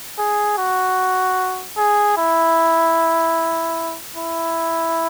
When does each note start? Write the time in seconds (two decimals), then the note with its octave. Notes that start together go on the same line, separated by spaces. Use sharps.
0.19 G#4
0.58 F#4
1.78 G#4
2.17 E4
4.16 E4